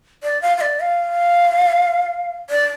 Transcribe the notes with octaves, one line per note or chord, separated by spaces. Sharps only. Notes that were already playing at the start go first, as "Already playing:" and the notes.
D5
F5
F5
D5
F5
D5